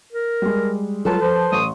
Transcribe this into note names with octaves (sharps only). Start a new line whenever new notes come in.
A#4
G3 G#3
F#3 F4 A4 B4 A5
F3 C5
A1 C6 C#6 D#6